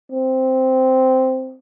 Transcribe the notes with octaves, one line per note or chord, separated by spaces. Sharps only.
C4